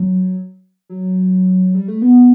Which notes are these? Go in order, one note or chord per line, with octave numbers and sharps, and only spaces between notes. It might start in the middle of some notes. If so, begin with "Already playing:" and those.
Already playing: F#3
F#3
G3
A3
B3